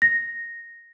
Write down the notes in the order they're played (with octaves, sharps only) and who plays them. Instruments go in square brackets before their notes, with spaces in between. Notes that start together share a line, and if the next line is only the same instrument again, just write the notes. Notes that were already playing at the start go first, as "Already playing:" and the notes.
[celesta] A#6